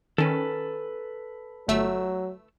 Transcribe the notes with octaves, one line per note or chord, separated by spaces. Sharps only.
D#3 C#4 A4 B4
G1 F#3 A3 E6